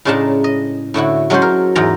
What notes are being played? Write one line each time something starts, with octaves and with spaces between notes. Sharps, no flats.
A2 C#3 G#3 D4 A5 A#5
D#5
A2 D3 E4 F#4
F#3 G#3 C#4 F#4 A4 C5
A#4
E2 G#2 A#5